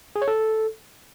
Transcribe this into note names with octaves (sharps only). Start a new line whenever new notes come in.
G#4
C#5
A4